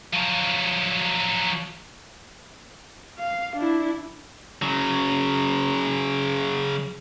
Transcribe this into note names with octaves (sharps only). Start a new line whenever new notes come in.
F3 F#3
F5
D4 E4
C#3 F#3